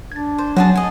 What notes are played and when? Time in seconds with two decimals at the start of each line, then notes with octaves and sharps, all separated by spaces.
0.12 D4 G#6 A6
0.38 C5
0.56 F#3 C#4 F#4 G#4 A5
0.75 G#4 D#5